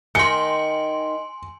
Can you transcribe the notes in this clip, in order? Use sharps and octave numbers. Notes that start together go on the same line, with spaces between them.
D#3 G#5 C6 C#7